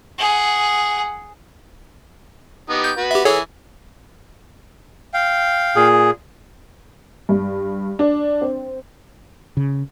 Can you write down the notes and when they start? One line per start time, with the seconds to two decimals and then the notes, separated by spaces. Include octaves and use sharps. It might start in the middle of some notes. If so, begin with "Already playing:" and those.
0.19 G#4 F#5
2.70 B3 D#4 G4
2.84 G6
2.97 F#4 B4
3.11 G4 E5
3.25 E3 G#4 A4 C#5 G#5
5.14 F5 G5
5.76 A#2 G#4
7.29 G2
7.99 D4
8.42 C4
9.57 C#3